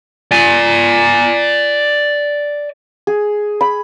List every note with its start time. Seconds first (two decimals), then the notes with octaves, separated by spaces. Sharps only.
0.31 D5 G#5
3.07 G#4
3.61 B5